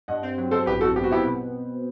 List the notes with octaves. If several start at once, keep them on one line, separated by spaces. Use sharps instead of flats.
G2 D#5 F#5
C4
F#3
C4 A4 C5
A1 G4 B4
C4 F#4 A4
B3 G4
F#4
B3 E4 G4
B2